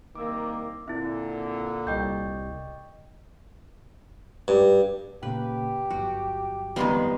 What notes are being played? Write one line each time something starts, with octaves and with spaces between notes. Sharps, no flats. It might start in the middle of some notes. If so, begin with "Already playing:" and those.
C2 D#3 A#3 D6 E6
A#2 D3 C4 E4 E5
C2 D5 D#5 G5 C#6 G6
G2
A#2 C#3 A#3 G4 B4
G1 F#3 F#4
F2 G#2 D#3 G3 B3 C6